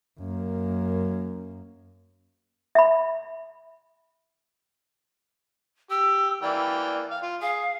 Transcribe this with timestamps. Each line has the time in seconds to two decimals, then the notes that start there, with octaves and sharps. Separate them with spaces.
0.19 F#2 A#3
2.75 E5 B5
5.90 G4 E6
6.42 E3 A#3 D5 G5
7.11 F5
7.23 F4
7.42 G#4 F5